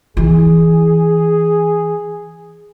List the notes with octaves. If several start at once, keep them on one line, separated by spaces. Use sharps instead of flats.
E3 G#4